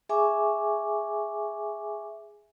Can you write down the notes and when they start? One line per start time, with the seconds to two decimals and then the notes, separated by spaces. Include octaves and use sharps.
0.09 G#4 E5 G#5 C#6 D6